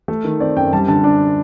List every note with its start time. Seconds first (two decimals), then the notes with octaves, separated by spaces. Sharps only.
0.08 A3
0.25 D#3
0.40 C4 D5
0.56 F#2 G5
0.73 G3 A5
0.88 D3 A5
1.04 D4